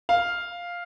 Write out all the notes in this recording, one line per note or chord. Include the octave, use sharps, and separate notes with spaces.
F5